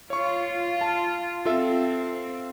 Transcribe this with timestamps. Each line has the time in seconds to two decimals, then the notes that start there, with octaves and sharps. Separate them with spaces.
0.10 F4 C#5 C#6
0.81 A5
1.45 C4 F4 A4 E5